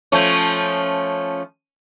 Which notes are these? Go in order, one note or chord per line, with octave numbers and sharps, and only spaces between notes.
F3 A3 C#4